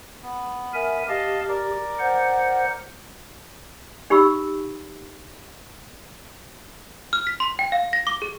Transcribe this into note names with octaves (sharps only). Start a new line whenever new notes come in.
B3
A#4 E5 G#5
G4 D#5 F5 A5
A#4 D5
C5 F#5
D#4 G4 B5 C#6 E6
F6
B6
C6
G5
F5
A#6
D6
G#4